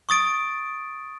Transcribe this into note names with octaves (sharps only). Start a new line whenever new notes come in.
C#6 D#6 A6 D7